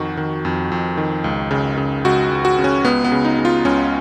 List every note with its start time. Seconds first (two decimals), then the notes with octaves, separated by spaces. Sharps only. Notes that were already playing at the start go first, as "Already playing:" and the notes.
Already playing: F2 D#3 F#4
0.17 D#3
0.45 F2
0.72 F2
0.97 D#3
1.24 C#2
1.51 C#3
1.77 C#3
2.05 C#2 F#4
2.31 C#2
2.45 F#4
2.58 C#3
2.64 C#4
2.84 C#2 B3
3.05 B3
3.12 C#3
3.25 D#4
3.38 C#3
3.45 F4
3.65 C#2 C#4